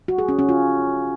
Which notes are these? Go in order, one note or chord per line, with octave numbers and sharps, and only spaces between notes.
F#4
G#4
C#4
C#4
F4